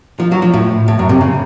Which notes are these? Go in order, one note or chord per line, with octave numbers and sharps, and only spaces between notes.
F3
F#3
F3
A2
A2
F#2
C3
C#3